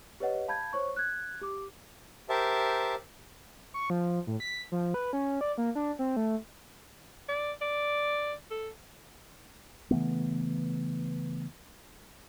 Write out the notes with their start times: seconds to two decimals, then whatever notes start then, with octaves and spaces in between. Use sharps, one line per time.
0.20 G4 B4 C#5 D#5 F#5
0.48 F5 A5 B5 G6 G#6
0.73 C5 C#5 C#6
0.96 F#6 G#6
1.41 G4 D6
2.29 G4 A#4 C5 E5 A5
3.74 C#6
3.90 F3
4.27 A2
4.40 B6
4.72 F3
4.94 B4
5.13 C#4
5.41 D5
5.58 A#3
5.75 D4
5.99 C4
6.16 A3
7.28 D5
7.61 D5
8.51 A4
9.91 C#3 E3 A3 B3